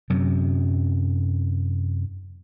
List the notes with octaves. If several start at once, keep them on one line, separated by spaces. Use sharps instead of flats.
F#2 C3 F#3